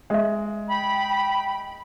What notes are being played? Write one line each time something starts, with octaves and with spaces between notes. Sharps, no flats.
G#3 D#5 E5
G5 B5